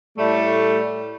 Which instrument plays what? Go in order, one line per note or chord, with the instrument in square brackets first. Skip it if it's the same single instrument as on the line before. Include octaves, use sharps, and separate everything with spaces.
[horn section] A2 G3 A3